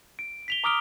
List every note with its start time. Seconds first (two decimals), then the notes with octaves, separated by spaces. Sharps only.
0.19 D7
0.48 B6 F7 G7
0.64 A#5 D6 D#6 F6 D7 G7